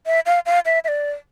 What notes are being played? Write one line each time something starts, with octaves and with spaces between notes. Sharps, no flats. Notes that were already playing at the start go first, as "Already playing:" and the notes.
E5
F5
F5
E5
E5
D5